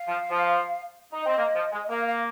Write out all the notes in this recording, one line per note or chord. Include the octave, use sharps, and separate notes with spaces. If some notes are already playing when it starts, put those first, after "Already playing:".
Already playing: F5
F3
F3
D#4
C4 D#5
A#3
F3
G#3
D#5
A#3 F5
F5